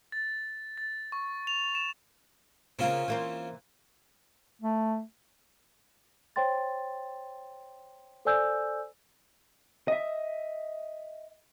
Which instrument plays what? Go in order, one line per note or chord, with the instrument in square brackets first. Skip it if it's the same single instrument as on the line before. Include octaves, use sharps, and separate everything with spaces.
[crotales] A6
A6
C#6
F7
E7
[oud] C#3 A#3 [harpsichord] C4 C#4 F4
[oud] E3 A#3 C5
[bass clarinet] A3
[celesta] C5 C#5 G5 C6 A6
A4 C5 D5 G#5 E6 G6
[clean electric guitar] D#5 E5